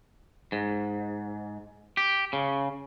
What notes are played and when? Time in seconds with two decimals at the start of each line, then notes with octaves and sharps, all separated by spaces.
0.52 G#2
1.97 G4
2.33 C#3